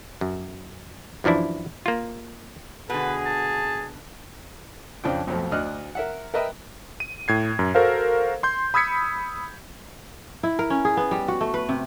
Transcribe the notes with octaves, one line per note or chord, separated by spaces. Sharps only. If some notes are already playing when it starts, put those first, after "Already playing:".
F#2
F#2 E3 F3 D4 E4
A#3 F4
B2 D3 G#4 B4
A5
F2 C#3 F3 D4 F4 G5
B1 F2 F3 A3
D2 D4 D#5 F6 F#6
A#4 E5 F#5
A#4 B4 D#5 E5 G5 B5
D#7
A2 G#6 C7
F#2
F#4 A4 A#4 C5 F5
C6 G6
B5 D#6 E6 G#6 B6 C#7
E4
A#4
C#4
G#4
B3
G3
F#4
A3
B4
C3